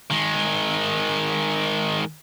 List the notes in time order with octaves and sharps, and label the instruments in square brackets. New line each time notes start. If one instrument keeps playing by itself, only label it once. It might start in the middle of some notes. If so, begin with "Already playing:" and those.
[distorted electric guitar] D#3 G#3